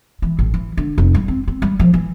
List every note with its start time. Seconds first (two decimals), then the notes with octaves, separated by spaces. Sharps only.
0.22 E3
0.39 A1
0.54 E3
0.77 D3
0.98 F1
1.15 G3
1.28 C4
1.48 C4
1.62 G3
1.80 F3
1.94 E3